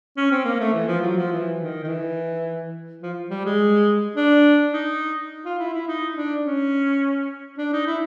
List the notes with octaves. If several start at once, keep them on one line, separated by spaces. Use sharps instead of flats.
C#4
C4
A#3
A3
E3
F3
F#3
F3
E3
D#3
D#3
E3
F3
G3
G#3
D4
D#4
F4
E4
E4
D#4
D4
C#4
D4
D#4
E4